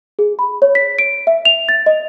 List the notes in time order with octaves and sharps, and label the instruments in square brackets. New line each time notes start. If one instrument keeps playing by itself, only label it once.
[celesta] G#4
B5
C#5
B6
D7
E5
F7
A6
D#5